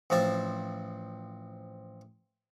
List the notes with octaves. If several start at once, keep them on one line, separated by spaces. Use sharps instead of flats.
A1 F3 C4 A5